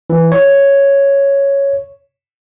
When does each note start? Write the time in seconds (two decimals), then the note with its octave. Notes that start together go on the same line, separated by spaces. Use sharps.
0.10 E3
0.32 C#5